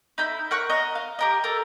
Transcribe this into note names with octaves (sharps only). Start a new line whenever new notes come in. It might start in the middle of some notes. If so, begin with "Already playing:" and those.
D#4 E4 B5 G6
A#4 F#5 C#6 F#6
D#5 A#5
F5
G4 A#4 D#5
A4 A#4